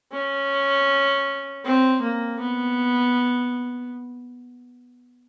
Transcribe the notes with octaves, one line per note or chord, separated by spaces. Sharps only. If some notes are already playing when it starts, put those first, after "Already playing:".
C#4
C4
A#3
B3